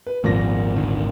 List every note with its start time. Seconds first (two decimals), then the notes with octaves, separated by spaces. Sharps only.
0.07 B4
0.24 D#1 G#1 A#2 F3 A#3 A#6
0.76 D1 D3 D#3